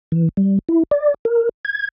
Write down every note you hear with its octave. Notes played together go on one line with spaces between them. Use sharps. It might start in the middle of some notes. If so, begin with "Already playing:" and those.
E3
G3
E4
D5
A#4
G#6